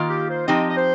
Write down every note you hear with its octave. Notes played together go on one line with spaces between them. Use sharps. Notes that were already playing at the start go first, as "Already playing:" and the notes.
Already playing: D#3 A#3 F4
G4
C5
F3 C4 D#4 G4 D#5
D#5
C5